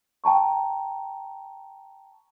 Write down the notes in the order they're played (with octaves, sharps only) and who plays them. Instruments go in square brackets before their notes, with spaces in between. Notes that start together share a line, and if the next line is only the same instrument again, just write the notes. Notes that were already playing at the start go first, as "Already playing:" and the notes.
[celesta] G5 A5 A#5 C#6